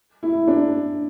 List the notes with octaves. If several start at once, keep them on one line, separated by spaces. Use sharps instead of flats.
E4
D4